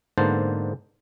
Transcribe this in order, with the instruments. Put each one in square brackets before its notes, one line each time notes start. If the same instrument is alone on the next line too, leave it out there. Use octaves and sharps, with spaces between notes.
[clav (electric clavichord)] G#2 D3 A#3 B3 C5 A5